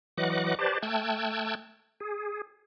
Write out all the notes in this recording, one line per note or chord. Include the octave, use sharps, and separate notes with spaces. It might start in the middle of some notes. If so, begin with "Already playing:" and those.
E3 F#3 D#5 F#5 D6 F#6
G4 B4 C5 D5 A5
A3 G5 A5 E6 F#6 G#6
G#4